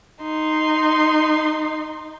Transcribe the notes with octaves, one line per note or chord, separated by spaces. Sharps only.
D#4 C6